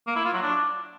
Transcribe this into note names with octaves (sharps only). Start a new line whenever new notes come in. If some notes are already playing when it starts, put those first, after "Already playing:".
A#3
E4
F4
F#3
D4